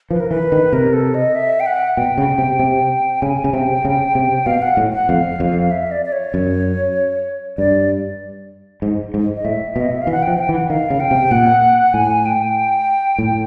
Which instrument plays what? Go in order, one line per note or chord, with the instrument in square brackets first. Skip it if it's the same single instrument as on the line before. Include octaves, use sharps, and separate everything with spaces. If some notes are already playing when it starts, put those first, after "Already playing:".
[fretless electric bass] F3 [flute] B4
[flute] A#4
[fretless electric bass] E3 [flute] B4
[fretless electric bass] D#3
[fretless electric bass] C3 [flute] A#4
[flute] A4
D#5
E5
G5
F#5
[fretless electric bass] B2 [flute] G5
[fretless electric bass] C#3
C3
C3
[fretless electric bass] C#3 [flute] G#5
[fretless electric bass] C#3
[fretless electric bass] C3 [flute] G5
[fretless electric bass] C#3
C3
[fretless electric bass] B2 [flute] F5
[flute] F#5
[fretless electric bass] A2
[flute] F#5
[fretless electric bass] F2 [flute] F5
[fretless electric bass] F2
[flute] E5
D5
D5
C#5
[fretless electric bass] F#2
[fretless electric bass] G2 [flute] D5
[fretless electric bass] G#2
G#2
[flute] D#5
[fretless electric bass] A2 [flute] E5
[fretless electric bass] B2
[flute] D#5
E5
F5
[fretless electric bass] E3
[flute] F#5
G5
[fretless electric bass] F3
[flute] G5
[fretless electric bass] E3
[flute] F#5
[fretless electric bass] D#3 [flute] F5
[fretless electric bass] C#3
[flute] G5
[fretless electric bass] C3
[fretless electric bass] A#2 [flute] F#5
[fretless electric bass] A2 [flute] G#5
[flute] G5
[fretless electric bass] A2